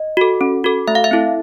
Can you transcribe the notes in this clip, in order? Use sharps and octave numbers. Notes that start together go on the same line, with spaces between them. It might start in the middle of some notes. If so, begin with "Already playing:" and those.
Already playing: D#5
F#4 A4
C#4
F#4 A4
A3 E5
F5
E5
C4 E4 A4